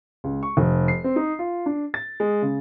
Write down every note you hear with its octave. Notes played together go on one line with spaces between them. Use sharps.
C#2
C#6
F1
C7
C4
D#4
F4
D4
A6
G#3
C#3